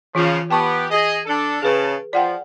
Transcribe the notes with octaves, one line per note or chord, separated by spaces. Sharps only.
C#3 E3 F3 F4
B3 G4 G5 A5 C#6
G#4 D#5
D4 A4
C#3 G#4 B4 A5
F3 D5 F#5 G5